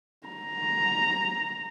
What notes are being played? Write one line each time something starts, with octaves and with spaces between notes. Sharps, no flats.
A#5